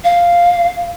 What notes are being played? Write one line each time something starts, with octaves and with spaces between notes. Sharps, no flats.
F5